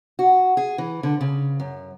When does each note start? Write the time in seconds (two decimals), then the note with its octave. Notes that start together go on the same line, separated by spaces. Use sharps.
0.19 F#4
0.57 G#4
0.78 E3
1.03 D3
1.21 C#3
1.60 F#2